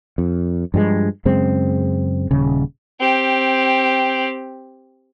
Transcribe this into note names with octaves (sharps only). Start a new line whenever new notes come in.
F2
G2 F3 G3 G#3
F#2 C#3 G#3 C4
D#1 C#3
C4 G4